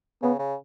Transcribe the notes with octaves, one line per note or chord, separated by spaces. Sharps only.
C#3 B3
C#3